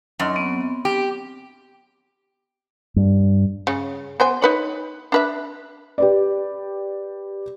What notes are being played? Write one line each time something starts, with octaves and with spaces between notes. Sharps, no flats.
F#2 D#4 D#5 C6
B3 C4
G4
G2
C#3 C#4
B3 C5 G#5
D#4 B4 C#5
D4 B4 E5
G4 B4 D5